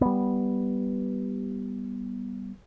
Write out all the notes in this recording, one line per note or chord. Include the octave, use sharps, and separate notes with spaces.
G3 B3